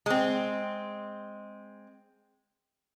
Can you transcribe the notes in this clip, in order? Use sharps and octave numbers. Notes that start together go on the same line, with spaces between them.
G#3 C4